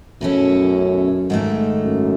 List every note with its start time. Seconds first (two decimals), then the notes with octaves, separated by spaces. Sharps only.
0.21 F#2 B2 A3 C#4 E4
1.30 G#2 D#3 A3
1.84 F#2